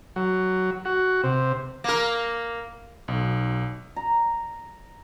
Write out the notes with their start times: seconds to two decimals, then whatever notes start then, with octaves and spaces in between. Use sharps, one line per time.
0.16 F#3
0.85 F#4
1.24 C3
1.84 A#3 A#4
3.08 B1
3.96 A#5